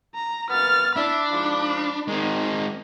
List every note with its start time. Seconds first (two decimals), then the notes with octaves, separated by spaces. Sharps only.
0.15 A#5
0.50 F#2 A#3 B3 F6 A6
0.96 D4 E4 D5 E5 B5
1.32 G#2 F3
2.08 D#3 G#3 C4